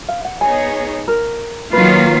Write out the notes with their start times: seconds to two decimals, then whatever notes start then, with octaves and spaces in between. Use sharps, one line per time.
0.08 F5
0.25 F#5
0.41 B3 D#4 G#4 C#5 G#5
1.08 A#4
1.73 D#3 F#3 A#3 F4 B4